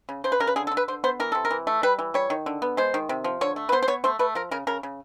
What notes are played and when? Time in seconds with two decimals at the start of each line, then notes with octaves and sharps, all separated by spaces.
0.09 C#3
0.24 C#3 C5
0.32 B4
0.40 C#3 A#4
0.47 B4
0.56 D3 G#4
0.67 A4
0.71 D3
0.77 B4
0.88 D3 C5
1.04 B3 C5
1.20 E3 A#4
1.32 C3 A4
1.45 A#4
1.51 E3
1.67 A3
1.83 G3 B4
1.99 E3
2.14 G3 C#5
2.30 D#3
2.46 D3
2.62 B3
2.77 G#3 C5
2.94 D#3
3.09 C3
3.24 F3
3.41 D3 C#5
3.56 A3
3.69 B4
3.72 B3 C5
3.82 C5
3.88 B3 C#5
4.04 A3 C5
4.19 A3 B4
4.35 F3 A#4
4.51 C#3 A#4
4.67 C#3 A#4
4.83 C#3